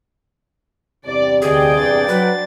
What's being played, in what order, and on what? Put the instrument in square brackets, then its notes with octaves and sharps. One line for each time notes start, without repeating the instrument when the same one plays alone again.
[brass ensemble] E2 G2 C3 [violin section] D5
[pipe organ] D2 D3 D#5 [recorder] G#4 [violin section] D5 G5
[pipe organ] D4 C5 A6
[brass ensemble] F#3 [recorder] B4